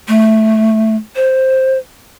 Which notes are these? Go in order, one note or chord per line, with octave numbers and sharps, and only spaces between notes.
A3
C5